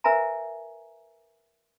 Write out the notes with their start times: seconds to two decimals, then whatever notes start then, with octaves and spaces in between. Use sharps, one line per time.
0.04 A#4 B4 E5 G#5 A#5